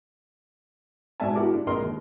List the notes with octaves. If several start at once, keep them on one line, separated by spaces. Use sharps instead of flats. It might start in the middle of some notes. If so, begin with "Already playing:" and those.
G#2 B2 D5 E5 G#5 A5
G#3 E4 F#4 G4 A#4 D6
D4
A#1 F2 G#3 A#4 D#5 C6
D#2